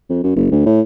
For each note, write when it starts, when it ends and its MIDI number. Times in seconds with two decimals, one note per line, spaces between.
0.10 0.19 41
0.23 0.33 42
0.36 0.51 30
0.51 0.64 38
0.66 0.81 45